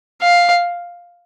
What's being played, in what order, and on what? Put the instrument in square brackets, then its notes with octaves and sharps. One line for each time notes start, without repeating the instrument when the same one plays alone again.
[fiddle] F5